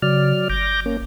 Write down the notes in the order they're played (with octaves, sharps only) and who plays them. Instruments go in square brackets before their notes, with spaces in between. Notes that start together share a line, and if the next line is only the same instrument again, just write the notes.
[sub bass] C#3 [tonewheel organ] F#3 D5 F6
[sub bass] G1 [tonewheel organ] D6 G6 A#6
[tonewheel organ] A#3 C#4